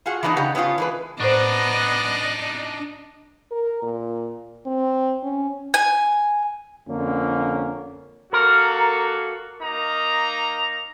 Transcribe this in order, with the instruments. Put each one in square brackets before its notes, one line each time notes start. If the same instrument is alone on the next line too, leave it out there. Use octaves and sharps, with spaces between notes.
[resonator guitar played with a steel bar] F4 F#4 G#4 F#5
E3 A#3 B3 D4 D#4
C#3 D#4 G4 F#5
B3 C#4 D4 E4 F4
E3 G#3 B4
[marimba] A2 C5 [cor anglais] B3 [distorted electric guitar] D4 D#4 [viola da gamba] D5 D#5
[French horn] A#4
A#2
C4
C#4
[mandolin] G#5
[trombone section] F2 D3 A#3 C#4
[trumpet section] A#3 F#4 A4 [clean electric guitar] A#4
[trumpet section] A#3 D#4 A#5